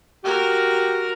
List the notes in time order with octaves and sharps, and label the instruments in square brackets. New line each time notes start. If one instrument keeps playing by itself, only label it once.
[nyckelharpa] F#4 A#4 [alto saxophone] G4